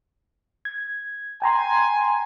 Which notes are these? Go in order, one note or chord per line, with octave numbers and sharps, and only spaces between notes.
G#6
G5 G#5 A#5 C6